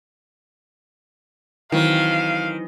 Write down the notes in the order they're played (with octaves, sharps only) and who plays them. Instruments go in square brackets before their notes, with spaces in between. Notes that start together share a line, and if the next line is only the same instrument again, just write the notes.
[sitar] D#3 [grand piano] E3 F#3 C4 [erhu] F5